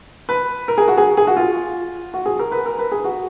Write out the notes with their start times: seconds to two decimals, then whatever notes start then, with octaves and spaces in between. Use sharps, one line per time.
0.29 B4
0.68 A#4
0.78 G#4
0.88 F#4
0.98 G#4
1.17 G#4
1.27 F#4
1.37 F4
2.14 F#4
2.26 G#4
2.39 A#4
2.52 B4
2.66 A#4
2.79 B4
2.92 G#4
3.04 F#4